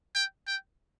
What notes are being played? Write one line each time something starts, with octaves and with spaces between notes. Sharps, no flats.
G5
G5